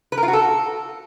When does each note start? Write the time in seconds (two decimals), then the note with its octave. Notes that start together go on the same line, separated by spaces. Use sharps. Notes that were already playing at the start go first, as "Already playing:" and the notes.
0.12 B4
0.17 A#4
0.23 F4
0.28 F#4
0.33 A4